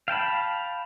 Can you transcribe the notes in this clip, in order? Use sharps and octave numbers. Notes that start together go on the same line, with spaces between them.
F5 G5 A5 B5